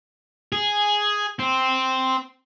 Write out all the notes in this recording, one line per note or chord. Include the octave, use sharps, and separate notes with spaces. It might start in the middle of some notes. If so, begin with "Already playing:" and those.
G#4
C4